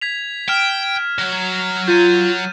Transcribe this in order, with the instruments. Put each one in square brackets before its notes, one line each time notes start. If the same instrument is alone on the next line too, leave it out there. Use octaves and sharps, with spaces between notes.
[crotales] G#6 B6 F7
[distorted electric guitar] G5 [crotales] F6 E7
[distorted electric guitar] F#3
[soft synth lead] F4 [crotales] G6 A6 D#7